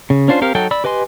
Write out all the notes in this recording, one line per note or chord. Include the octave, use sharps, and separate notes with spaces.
C#3
C#4 D4 F4 C5
C4 G4 A#4 F5
F#3 D#4 F#4 A4 G5
D5 B5 E6
G4 B4 D#5 G#5 C6